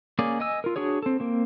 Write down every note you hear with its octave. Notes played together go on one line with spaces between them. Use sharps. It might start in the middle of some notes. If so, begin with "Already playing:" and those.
A#3 C#4 G#4 D5
D#5 G#5 E6
F4 A#4
D4 F#4 G#4 C#5
C4 A4
A#3 C4